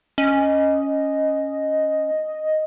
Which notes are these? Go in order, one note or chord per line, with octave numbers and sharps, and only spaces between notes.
C#4 D#5